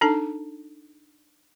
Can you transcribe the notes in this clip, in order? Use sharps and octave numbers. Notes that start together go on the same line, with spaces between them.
D4 D#4 A4 A5